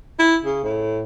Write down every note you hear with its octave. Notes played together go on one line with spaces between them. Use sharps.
E4
C#3
A2